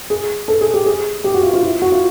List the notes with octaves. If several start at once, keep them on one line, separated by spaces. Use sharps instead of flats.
G#4
A4
G#4
G4
G#4
G4
F#4
F4
F4
E4
F#4
F4